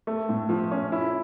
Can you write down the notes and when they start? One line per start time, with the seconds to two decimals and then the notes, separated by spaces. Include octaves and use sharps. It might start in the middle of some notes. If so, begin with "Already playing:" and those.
0.07 A3
0.29 A2
0.49 F3
0.71 C#4
0.92 E4